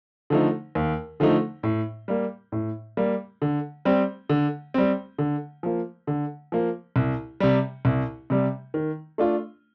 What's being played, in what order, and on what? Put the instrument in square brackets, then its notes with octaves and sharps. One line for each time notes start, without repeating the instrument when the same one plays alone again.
[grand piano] D3 F3 A3 D#4
D#2
D3 F3 A3 D#4
A2
G3 A#3
A2
G3 A#3
D3
G3 C4
D3
G3 C4
D3
F3 A#3
D3
F3 A#3
C2
C3 G3
C2
C3 G3
D#3
A3 D4 F4